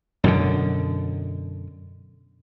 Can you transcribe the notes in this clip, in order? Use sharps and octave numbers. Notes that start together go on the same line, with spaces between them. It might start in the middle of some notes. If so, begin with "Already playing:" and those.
F#2 B2 D3